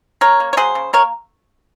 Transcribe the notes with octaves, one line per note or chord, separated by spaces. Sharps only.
C#3 A#4 C#5
A#3
C#5
F#3 G#4 C5
C#3
A#3 A#4 C#5